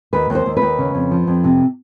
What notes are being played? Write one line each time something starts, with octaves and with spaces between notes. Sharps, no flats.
D#2 B4
D#2 C5
D#2
B4
D#2
C#3
F2
F3
F2
C3